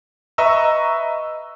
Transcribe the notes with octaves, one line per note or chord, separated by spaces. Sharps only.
B4 D#5 E5 A#5 C#6 E6